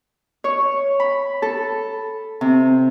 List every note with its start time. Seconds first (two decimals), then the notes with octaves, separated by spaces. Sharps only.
0.44 C#5
1.00 B5
1.42 A4
2.41 C3